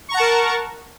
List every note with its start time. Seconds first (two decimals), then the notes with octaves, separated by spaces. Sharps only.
0.08 C#6
0.11 A#5
0.14 F#5
0.17 A5
0.20 A#4